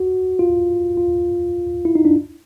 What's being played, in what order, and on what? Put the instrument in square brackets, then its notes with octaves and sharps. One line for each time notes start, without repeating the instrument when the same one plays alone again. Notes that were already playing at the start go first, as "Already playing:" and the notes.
Already playing: [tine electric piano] F#4
F4
F4
E4
D#4
D4